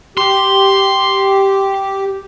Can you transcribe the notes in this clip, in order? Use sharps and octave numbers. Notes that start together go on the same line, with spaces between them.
G4 C6